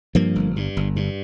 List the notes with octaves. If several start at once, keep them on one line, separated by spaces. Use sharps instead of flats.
G2 F3 A#3
G1
G2
G1
G2